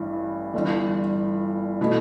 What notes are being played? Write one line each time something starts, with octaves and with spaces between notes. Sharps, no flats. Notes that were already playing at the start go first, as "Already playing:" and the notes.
Already playing: A1 G2 E3
G1 G2 E3
B2 A3 E4